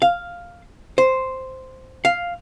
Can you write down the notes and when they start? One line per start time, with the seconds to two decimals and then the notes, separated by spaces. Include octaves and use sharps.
0.02 F5
0.98 C5
2.05 F5